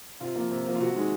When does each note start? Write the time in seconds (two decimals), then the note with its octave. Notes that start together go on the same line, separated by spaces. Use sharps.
0.20 C3 F4
0.36 F3 A#3
0.51 C3
0.66 F3 A#3
0.75 F4
0.81 C3 F#4
0.95 D#3 G#3